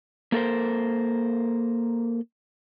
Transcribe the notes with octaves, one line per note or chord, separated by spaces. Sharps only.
A#3 A4 A#4 C5